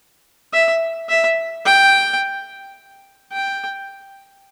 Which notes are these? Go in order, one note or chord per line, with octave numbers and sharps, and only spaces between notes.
E5
E5
G5
G5